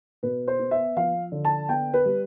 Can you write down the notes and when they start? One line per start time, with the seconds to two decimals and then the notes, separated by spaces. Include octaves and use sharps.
0.23 B2 B4
0.48 C5
0.59 B3
0.71 E5
0.97 F3 F5
1.32 D3
1.45 A5
1.69 B3 G5
1.94 B4
2.06 G3